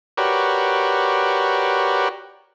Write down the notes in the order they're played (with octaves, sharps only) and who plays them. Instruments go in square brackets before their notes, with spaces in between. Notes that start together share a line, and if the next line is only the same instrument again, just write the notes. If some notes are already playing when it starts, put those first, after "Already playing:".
[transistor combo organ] F#4 G4 A#4 B4 C#5 D5